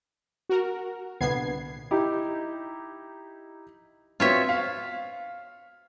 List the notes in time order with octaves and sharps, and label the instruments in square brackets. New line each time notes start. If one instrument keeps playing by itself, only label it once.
[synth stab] F#4 A#4
C2 A#2 D3 B3 G#6 C7
[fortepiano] D#4 E4 G4
[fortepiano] B3 C4 F#4 [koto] F4 C#5 E5
[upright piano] F5